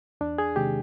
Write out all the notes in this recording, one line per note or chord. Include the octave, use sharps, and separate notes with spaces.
E2 D4
G#4
C3 D#3 G#3 G4